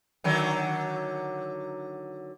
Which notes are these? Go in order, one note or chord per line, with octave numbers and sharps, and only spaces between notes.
D3 D#3 F#3